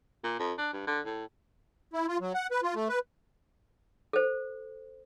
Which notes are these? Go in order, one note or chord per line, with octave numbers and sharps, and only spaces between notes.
A#2
F2
D4
G2
D3
A2
E4
F4
F#3
F#5
B4
F4
A3
B4
A4 C5